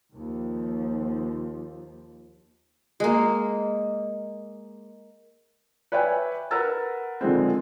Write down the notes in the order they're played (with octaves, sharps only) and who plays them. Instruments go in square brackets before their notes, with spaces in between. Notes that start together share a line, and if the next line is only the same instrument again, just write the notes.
[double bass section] D#2 F3
[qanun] G#3 A#3
[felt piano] B4 C#5 D5 E5 G5 G#5
A#4 B4 F#5 A#5 E6 A6
D3 D#3 F3 G#3 C4